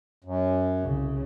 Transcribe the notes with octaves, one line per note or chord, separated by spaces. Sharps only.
F#2
C2 C#3